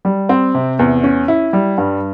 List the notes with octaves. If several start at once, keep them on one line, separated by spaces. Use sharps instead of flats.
G3
C4
C3
E2
C#4
E4
G3
G2